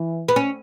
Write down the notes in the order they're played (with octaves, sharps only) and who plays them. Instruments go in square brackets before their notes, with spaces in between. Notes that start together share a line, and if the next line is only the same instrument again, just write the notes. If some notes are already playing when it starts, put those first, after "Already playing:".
Already playing: [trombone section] E3
[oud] B3
C#4